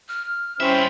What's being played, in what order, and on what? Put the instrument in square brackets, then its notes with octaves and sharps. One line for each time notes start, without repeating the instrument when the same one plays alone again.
[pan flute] F6
[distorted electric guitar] G2 E5 [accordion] C4 C#4 [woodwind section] E4 G4 C5